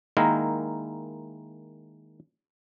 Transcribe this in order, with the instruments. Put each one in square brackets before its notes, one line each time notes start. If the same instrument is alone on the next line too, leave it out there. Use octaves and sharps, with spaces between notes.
[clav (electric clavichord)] D#3 G#3 A#3 D#4 E4 A#4